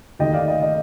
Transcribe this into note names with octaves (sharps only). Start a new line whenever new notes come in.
D#2 D#3 A3 D#4 D#5 G5
D5 F5
D#5
D#5